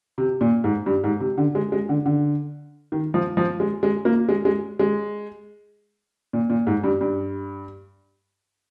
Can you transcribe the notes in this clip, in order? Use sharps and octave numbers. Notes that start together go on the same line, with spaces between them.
C3
A#2
G#2
G2
G#2
C3
D3
G#3
G#3
D3
D3
D#3
F3
F3
G#3
G#3
A#3
G#3
G#3
G#3
A#2
A#2
G#2
G2
G2